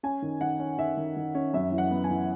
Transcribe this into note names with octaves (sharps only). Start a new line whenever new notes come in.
C#4 G#5
D#3
D#3 F#5
C#4
D#3 E5
D#3
D#3
C#4
F#2 E5
E3
F#5
B3
G#5
E3